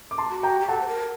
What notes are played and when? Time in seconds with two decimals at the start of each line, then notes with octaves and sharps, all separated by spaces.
0.11 D6
0.18 A5 C6
0.31 F#4
0.43 G5 A#5
0.61 G4
0.68 A4 F#5 A5
0.81 C5
0.88 A#4